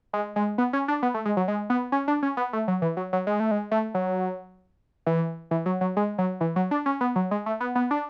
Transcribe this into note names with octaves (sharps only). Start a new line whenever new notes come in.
G#3
G#3
B3
C#4
D4
B3
A3
G#3
F#3
G#3
B3
C#4
D4
C#4
B3
A3
F#3
E3
F#3
F#3
G#3
A3
G#3
A3
F#3
E3
E3
F#3
F#3
G#3
F#3
E3
F#3
D4
C#4
B3
F#3
G#3
A3
B3
B3
D4